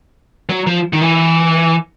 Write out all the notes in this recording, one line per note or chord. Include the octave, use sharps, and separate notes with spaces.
F#3
F3
D#3
E3